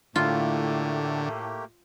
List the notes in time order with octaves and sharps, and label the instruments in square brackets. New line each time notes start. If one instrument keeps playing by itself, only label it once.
[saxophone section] A2 [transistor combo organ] D3 [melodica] A3 A#3 G4 [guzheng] F4